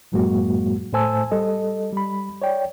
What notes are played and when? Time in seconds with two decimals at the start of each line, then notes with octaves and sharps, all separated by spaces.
0.12 F#2 A2 F#3 G#3 A#3 F#4
0.93 A2 A3 C5 G#5 A5 E6
1.31 G3 A4 D#5
1.93 G3 B5
2.42 C#5 D5 G5